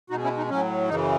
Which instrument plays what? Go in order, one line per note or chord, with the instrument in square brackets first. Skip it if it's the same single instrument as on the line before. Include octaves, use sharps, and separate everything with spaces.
[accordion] B2 G#3 D#4 F#4
C#4 E4
D#4
A2 F#3 C#4
F#2 C#3 E3 D#4